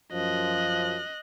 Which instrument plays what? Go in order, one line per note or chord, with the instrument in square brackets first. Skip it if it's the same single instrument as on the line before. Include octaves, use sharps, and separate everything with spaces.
[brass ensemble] F#2 F3 [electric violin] D#5 F#6